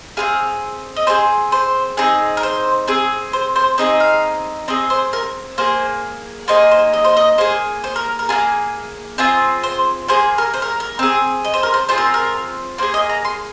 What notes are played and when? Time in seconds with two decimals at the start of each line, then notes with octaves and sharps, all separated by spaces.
0.17 C4 F4 G#4 F5
0.96 D#5
1.07 C4 G#4 C5
1.52 C5
1.97 C4 D#4 G#4
2.37 A#4
2.43 C5
2.88 C4 G#4
3.33 C5
3.56 C5
3.78 C4 D#4 G#4 D#5
4.00 F5
4.68 C4 G#4 D#5
4.90 C5
5.13 A#4
5.58 A#3 G#4 C5
6.48 A#3 D#4 G#4 C5
6.71 C5
6.93 D#5
7.05 C5
7.17 D#5
7.38 A#3 G#4 C5
7.84 C5
7.96 A#4
8.19 A#4
8.29 A#3 F4 G#4
9.18 C4 F4 G#4
9.63 C5
10.08 A#3 G#4 C5
10.38 A#4
10.54 C5
10.62 A#4
10.80 A#4
10.99 C4 G#4
11.45 D#5
11.54 C5
11.63 A#4
11.74 C5
11.89 C4 F4 G#4 C5
11.98 A#4
12.14 A#4
12.78 A#3 C5
12.83 G#4
12.94 D#5
13.09 A#5
13.25 C6